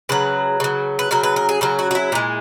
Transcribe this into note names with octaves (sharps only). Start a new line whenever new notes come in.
C#3 F#3 B4
C#3 F#3
B4
C#3 F#3 A#4
B4
A#4
G#4
C#3 F#3 A#4
F#4
F#4
E4
A#2 G#3